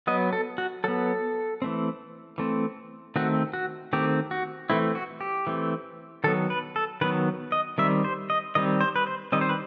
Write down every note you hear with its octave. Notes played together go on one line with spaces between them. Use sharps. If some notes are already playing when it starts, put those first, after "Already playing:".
F#3 B3 D#5
A4
F#4
F#3 B3 A4
E3 A3 C4
E3 A3 C4
D#3 A3 C4 F#4
F#4
D#3 A3 C4 G4
F#4
E3 A3 C4 E4
F#4
G4
E3 A3 C4
D#3 F#3 B3 A4
B4
A4
D#3 F#3 B3 B4
D#5
D#3 G3 C4 E5
C5
D#5
D#3 G3 C4 D#5
C5
B4
C5
D#3 G3 C4 D#5
C5
B4